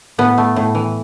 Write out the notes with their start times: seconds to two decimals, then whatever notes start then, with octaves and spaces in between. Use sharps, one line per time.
0.18 A2 B3
0.38 A3
0.56 A2
0.75 E3